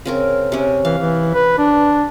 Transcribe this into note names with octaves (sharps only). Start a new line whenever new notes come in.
C#3 C4 A#4
C3 C#4
E3 F5
E3
B4
D4